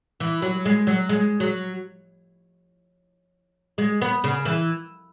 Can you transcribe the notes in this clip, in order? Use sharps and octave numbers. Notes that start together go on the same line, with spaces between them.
E3
F#3
G#3
F#3
G#3
F#3
G#3
B3
C#3
E3